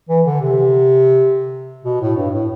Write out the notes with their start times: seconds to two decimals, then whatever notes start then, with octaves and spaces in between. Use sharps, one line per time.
0.09 E3
0.26 D3
0.41 C3
1.85 B2
2.01 A2
2.17 G2
2.33 A2